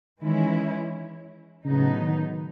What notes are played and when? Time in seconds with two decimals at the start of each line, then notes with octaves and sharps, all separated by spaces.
0.22 D#3 E3 G#3 C#4 E4
1.65 A2 C#3 F#3 B3 D#4
2.01 D#3